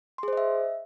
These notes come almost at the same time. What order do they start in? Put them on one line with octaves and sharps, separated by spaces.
C6 G#4 C5 D#5 E5